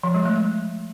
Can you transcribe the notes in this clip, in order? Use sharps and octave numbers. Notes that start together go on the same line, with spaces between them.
F3
G#3
A3